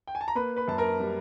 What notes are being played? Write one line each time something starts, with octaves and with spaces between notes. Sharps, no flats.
G5
G#5
A5
A#5
A#3 B4 B5
B4 B5
F#2 A5
A#4 A#5
G3